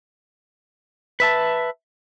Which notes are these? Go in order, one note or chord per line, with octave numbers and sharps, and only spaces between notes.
B4 E5 A5